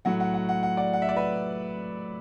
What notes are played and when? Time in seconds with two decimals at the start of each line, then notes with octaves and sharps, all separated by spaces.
0.05 A2 F#3 F#5
0.20 F#5
0.34 F#5
0.49 F#5
0.63 F#5
0.77 D5 F#5
0.93 F#5
1.02 E5
1.09 D5
1.16 B4 E5